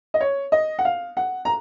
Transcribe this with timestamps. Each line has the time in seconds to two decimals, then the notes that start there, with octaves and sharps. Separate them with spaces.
0.14 D#5
0.21 C#5
0.52 D#5
0.79 F#5
0.85 F5
1.17 F#5
1.45 A#5